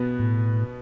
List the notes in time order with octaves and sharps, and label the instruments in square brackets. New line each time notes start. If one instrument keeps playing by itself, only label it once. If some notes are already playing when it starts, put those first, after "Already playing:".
Already playing: [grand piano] B2 B3
[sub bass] A2